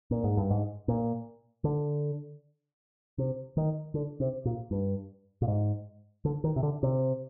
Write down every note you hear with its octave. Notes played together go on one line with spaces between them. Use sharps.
A#2
G#2
G2
G#2
A#2
D3
C3
D#3
D3
C3
A#2
G2
A#2
G#2
D3
D#3
C3
D3
C3